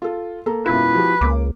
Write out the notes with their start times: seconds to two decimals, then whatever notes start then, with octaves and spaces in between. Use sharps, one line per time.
0.02 F4 A4
0.46 A#3 A4 A#5
0.66 E1 F#2 E4 F4 B4
0.94 F3 F#4 G4
1.21 C#2 A#3 D6